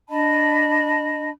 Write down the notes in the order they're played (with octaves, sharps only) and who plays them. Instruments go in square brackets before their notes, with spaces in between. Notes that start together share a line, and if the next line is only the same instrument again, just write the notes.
[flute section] D4 D#5 A5 B5